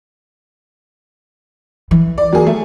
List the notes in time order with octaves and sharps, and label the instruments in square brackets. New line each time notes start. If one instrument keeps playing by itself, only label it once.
[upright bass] E3
[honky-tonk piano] D5
F#3 A#3 G#4
A3